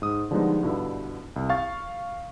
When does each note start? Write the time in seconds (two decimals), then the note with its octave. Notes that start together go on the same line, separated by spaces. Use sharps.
0.02 G#2 D#6
0.31 D3 F3 G3 G#3 B3 D#4
0.63 G2 B2 D3 E4
1.36 C2
1.50 F5 C#6 A6